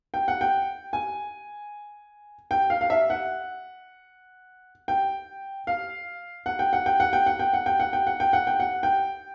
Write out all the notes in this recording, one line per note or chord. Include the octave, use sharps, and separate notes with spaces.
G5
F#5
G5
G#5
G5
F5
F5
E5
F#5
G5
F5
F#5
G5
F#5
G5
F#5
G5
F#5
G5
F#5
G5
F#5
G5
F#5
G5
F#5
G5
F#5
G5